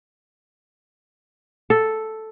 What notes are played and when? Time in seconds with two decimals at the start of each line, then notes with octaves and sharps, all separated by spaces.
1.70 A4